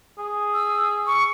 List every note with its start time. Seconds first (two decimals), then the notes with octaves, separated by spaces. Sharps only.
0.18 G#4
0.54 E6
1.07 C#6